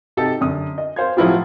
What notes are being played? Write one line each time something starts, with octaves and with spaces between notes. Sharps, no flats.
C3 D#4 G4 A4
F#2 D3 D#6
D#5
C5 F5 G#6
A2 F3 F#3 E4 F4 G4